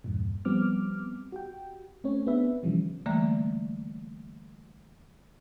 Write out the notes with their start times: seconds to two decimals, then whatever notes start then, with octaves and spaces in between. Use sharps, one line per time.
0.04 E2 G2 A#2
0.45 F3 G3 B3 C4 D6 F6
1.32 F#4 G4 G5
2.04 A3 C4 C#4 C#5
2.27 B3 C4 D4 G#4 B4 E5
2.63 B2 D3 E3 F3 G3 C#4
3.06 D3 E3 G3 A3 A#3